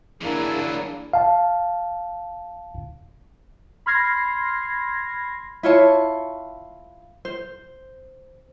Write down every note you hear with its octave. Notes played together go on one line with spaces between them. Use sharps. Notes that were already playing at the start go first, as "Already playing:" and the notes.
E3 F#3 A#3 D4 E4 G#4
F5 A5
B5 C6 F6 G#6 A#6 C7
E4 F4 C#5 A5
C5